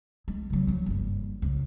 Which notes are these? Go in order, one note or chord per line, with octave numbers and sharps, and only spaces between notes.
G#3
C#3 F#3
F3 F#3
F#1 G2
C#2